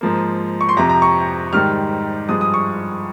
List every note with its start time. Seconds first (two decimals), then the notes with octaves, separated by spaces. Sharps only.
0.01 G#2 F3 A#3
0.61 C#6
0.69 C6
0.77 F2 C3 F3 A#5
0.89 A#5
1.02 C#6
1.53 G#2 D#3 G3 F6
2.29 G2 F3 G#3 D#6
2.41 D#6
2.54 C#6